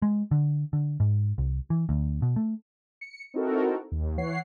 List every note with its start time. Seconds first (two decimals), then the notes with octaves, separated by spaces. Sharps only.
0.02 G#3
0.31 D3
0.73 D3
1.00 G#2
1.38 C2
1.70 E3
1.89 D2
2.22 B2
2.36 A3
3.01 C#7
3.34 C4 D#4 E4 F#4 A4 A#4
3.92 D#2
4.17 E3 C#5 F#5 C7